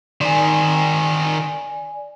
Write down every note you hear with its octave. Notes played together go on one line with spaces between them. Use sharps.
D#3 C5 D5 G#5